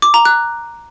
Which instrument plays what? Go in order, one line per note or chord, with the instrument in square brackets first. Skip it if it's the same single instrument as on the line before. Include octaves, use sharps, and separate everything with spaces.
[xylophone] D6
A#5
F#6